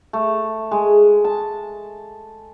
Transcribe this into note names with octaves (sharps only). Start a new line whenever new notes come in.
A3
G#3
A5